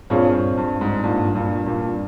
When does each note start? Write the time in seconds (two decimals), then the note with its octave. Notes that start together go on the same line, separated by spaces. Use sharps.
0.10 G2 A#2 C4 F4 G#4 C#5
0.57 G2
0.81 G#2
1.04 G2 A#2
1.35 G2 A#2
1.66 G2 A#2